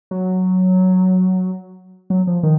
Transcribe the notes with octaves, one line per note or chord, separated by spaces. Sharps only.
F#3
F#3
F3
D#3